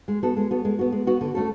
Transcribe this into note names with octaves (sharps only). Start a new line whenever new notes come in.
G#3
B3 F#4 A4
G#3
B3 F#4 A4
G#3
B3 F#4
G#3
B3 F#4
D3
A3 C#4 F#4 A4